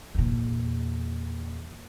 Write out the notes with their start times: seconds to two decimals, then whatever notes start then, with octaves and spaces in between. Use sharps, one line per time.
0.14 E2 A#2